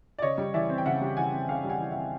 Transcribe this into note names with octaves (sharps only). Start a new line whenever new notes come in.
D5
C#3 C#5 D#5
G3
E3 D5 E5
C4
G5
C#3 E5 F#5
G3
E3 F#5 G#5
C4
C#3 F5 G5
G3
F#5 G#5
E3
E5 F#5
C4